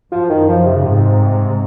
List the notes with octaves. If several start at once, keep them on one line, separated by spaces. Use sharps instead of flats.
F#2 F3
D#3
F3
C3
C#3
G#2 C3